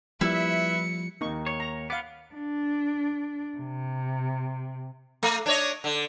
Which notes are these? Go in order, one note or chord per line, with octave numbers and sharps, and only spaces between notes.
F3 G3 A#3 E4 B4 E5 C#7
D#2 A#3 D#4 C#6
C#5
A#5
B3 F5 D6
D4
C3
A3
D4 C#5 D#5
D3